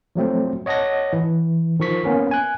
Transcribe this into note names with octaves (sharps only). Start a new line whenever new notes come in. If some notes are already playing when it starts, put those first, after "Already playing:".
F3 F#3 A3 C4
C#5 D#5 F#5 A5 A#6
E3
D#3 F3 C#6 B6
A#3 B3 C#4 A#4
G#5 F#6